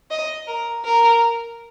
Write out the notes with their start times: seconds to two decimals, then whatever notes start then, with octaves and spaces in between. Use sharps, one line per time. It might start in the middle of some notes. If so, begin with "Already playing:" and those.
0.11 D#5
0.48 A#4
0.85 A#4